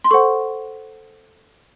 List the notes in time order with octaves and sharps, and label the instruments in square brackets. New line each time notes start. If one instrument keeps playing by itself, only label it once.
[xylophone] C6
A4 C5 F#5 C#6